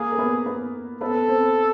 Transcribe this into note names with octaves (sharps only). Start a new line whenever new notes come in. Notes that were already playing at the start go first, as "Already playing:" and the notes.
Already playing: A#3 G#4 A#4
A#4
B3 B4
B3 B4
B3 A4 B4
C4 C5